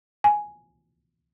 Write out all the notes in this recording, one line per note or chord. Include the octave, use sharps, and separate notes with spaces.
G#5